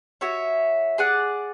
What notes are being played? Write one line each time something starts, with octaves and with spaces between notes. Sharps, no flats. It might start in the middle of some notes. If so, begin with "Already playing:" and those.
F#4 C#5 E5
G#4 D5 F#5